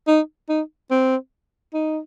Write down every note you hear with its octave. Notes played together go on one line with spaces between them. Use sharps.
D#4
D#4
C4
D#4